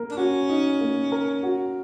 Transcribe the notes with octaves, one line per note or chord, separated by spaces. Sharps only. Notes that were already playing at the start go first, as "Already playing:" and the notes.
Already playing: A#3 A#4
D4
C#4 F#4
D#4
A#3
A#4
F#4